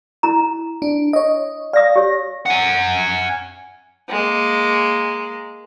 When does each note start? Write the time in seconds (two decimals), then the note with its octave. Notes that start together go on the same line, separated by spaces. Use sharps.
0.23 E4 A#5
0.82 D4
1.13 C#5 D#5
1.73 D5 F5 D#6 A#6
1.96 G4 C#5
2.46 F#5 G#5
4.09 G#3 A#3